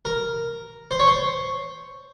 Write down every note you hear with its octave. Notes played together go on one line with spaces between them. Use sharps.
A#4
C5
C#5
C5